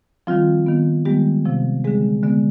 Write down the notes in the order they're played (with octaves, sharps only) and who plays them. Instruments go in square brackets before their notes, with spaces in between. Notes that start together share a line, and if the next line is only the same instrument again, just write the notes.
[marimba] D#3 F3 G3 C4 F4
D#3 B3
D#3 G3 G#3 B3 G4
C3 F3 C4
D3 G3 G#3 C4 G#4
D3 G#3 B3